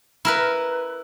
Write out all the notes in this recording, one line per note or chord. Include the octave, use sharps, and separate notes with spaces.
E4 A#4 B4